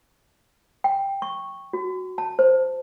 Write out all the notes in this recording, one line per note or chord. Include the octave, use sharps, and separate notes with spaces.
G5
C#6
F#4
A5
C5